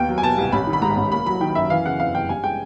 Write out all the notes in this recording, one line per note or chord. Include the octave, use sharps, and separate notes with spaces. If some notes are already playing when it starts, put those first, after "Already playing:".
Already playing: D#2 B3 G5
F#3
G#5
B2 A5
C2
A1 B5
D#3
B5
G#2 A#5
A1
A#3 B5
F#3 B5
D#3 G5
F#2 E5
E3 F5
C#3 F#5
F2 F5
F#1 G5
G2 G#5
G#3 G5